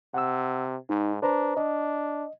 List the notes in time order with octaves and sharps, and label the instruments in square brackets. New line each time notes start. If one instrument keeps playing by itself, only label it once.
[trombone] C3 [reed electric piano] F#5 E6
[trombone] G#2 [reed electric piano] D#4
[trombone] D4 [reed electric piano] B4 C5 A#5
[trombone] D4 [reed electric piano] D#5